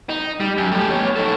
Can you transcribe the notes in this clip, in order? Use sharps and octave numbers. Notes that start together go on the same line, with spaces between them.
D#4
G3
F#2
A3 G4
B3 C#5
D#4 A4